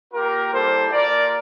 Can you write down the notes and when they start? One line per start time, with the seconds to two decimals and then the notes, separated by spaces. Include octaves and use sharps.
0.14 A#3 F4 G4 A#4
0.52 G3 A#3 E4 G4 A4 C5
0.90 A#3 F4 A#4 D5